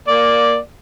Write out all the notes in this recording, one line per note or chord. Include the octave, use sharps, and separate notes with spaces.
A#3 D5